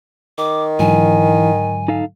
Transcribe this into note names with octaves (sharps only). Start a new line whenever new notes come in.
D#3 D6
G#2 D3 E3 F#3 G#5
D#4 A4 F5